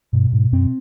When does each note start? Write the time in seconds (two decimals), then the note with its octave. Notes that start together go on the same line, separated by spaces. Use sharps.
0.13 G2 B2
0.33 G#2
0.52 F#2 C4